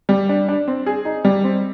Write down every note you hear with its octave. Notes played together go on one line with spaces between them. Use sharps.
G3
D4
D4
C4
G#4
D#4
G3
C4